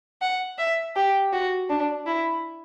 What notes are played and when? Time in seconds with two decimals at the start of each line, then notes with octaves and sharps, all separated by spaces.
0.22 F#5
0.58 E5
0.96 G4
1.32 F#4
1.69 D4
2.06 E4